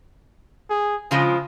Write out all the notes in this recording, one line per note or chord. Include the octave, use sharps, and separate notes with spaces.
G#4
C#3 F3 G#3 F4